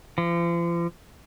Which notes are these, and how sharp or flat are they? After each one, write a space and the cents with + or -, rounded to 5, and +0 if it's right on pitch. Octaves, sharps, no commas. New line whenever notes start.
F3 -40